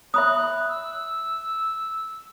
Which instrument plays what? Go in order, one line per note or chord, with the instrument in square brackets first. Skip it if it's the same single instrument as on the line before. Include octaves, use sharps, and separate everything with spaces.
[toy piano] E5 B5 D#6 [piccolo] F#6
[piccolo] E6